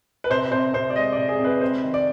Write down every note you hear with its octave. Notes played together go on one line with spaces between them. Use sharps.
B4
C3 C5
C3 C5
C3 C5
D5
G#3 D#5
D5
C3
G#4
C3
B4
C4 C5
D#3
D5